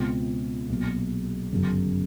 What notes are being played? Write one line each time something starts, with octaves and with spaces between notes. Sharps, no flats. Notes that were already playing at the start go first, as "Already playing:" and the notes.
Already playing: C#2 B2 G#3 C4 F4
B1 A#2 F#3
G1 F#2 C#3 F#3